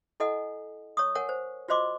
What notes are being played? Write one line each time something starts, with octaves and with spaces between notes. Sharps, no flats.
E4 A4 D#5 F#5 G#5
C#5 C#6 D#6
A#4 C#5 F#5 G#5
C5
F4 F#4 C5 D#5 C6 D6